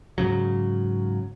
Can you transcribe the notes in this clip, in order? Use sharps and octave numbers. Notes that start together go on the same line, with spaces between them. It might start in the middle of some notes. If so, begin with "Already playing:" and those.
G#2 C#3 F#3